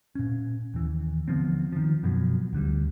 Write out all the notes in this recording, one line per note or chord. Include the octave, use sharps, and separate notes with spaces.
A#2 C#4
D#2 E3
D3 F3 B3 C4
D#3 F3
F#2 B2 F3 F#3
D2 D3 G3